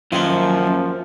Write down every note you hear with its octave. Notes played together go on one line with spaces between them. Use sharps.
F#2 D#3 F3 A#3 F4